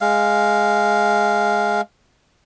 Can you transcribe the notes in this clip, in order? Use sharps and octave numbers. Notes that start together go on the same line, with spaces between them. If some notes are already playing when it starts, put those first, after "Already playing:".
G#3 F5